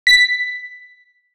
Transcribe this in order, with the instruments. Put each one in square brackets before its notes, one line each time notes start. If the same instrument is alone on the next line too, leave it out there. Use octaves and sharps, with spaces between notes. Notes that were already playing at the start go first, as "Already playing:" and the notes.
[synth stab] B6